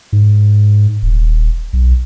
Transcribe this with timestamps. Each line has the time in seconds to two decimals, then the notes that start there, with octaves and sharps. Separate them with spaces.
0.13 G#2
1.03 D#1
1.73 B1